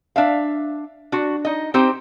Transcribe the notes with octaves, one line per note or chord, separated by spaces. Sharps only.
D4 E5 F5
D4 F#4
D#4 D#5
C4 D#4 G4 C5